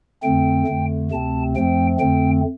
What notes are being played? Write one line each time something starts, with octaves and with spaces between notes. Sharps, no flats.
F2 D3 A3 C4 G5
F2 D3 A3
D2 C3 A3 C4 A5
F2 F3 A3 C4 G5
F2 D3 A3 C4 G5